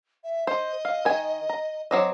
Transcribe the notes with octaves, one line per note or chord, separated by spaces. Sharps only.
E5
C5 D#5
F5
D#3 G#5
A#5
F#3 C4 D#5 D6